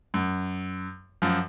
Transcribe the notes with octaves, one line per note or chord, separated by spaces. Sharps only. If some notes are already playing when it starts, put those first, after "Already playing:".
F#2
F#2 F3